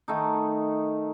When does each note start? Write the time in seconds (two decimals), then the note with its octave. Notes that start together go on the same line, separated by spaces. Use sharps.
0.08 D#3 A3 D#4